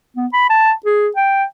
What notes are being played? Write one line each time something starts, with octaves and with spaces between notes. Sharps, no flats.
B3
B5
A5
G#4
G5